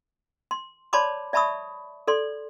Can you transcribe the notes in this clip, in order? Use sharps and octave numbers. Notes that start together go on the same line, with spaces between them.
C6
C#5 D5 A5 B5 C6 D6
D5 E5 A5 B5 C#6 D#6
A4 D5 C6